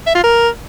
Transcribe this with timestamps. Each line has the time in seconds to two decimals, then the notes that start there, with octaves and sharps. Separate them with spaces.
0.07 E5
0.15 F4
0.24 A#4